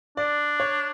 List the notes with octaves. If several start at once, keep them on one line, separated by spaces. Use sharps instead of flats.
D4 D5
C#5